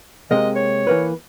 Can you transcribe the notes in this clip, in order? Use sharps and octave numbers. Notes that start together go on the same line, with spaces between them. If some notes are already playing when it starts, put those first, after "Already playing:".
C3 G#3 A#3 D#5
C#5
E3 A#3 B4